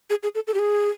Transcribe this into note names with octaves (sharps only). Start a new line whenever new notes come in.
G#4
G#4
A4
A4
G4
G#4